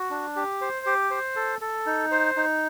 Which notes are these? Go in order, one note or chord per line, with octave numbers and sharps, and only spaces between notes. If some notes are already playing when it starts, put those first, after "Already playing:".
Already playing: F#4
D4
G4
C5
G4
C5
A4
A4
D#4
C5
D#4